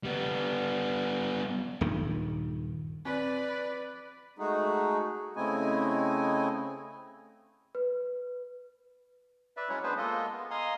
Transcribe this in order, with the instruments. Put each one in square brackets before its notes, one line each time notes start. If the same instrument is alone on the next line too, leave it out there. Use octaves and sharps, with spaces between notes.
[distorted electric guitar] G3 B3
[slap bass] D#1 G2 D#3
[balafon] C4 [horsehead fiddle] B4 D5
[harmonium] G#3 A3 D#4 F#4 G#4
C#3 A3 C4 E4 D#5 G#5
[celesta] B4
[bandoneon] B4 D5 E5
F#3 G#3 C#4 E4 C#5
B3 D4 G#4 B4 C5
G#3 A#3 F4 A4 D#5
B3
D#5 F5 G#5 A#5 C6 D#6